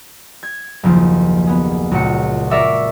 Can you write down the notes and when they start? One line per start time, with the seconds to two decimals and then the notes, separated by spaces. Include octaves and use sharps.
0.43 G#6
0.83 F#1 D#2 F3
1.47 B3 G#4
1.91 C#2 A#2 F#4 F#5 C#7
2.50 A#4 D5 E5 C#6 D6